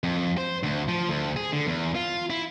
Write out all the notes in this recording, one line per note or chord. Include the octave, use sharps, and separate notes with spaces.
F2
C5
D2
F3
D2
G#4
D3
E2
F4
E4